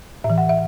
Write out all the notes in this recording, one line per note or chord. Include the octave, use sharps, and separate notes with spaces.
A2 E5
E3
F#5
E5